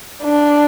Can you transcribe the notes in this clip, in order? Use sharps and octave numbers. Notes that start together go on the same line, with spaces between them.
D4